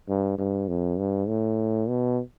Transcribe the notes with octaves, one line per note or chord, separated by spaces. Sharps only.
G2
G2
F2
G2
A2
B2